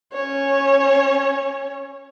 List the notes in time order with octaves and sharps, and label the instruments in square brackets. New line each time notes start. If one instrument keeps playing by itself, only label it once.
[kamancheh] C#4 C#5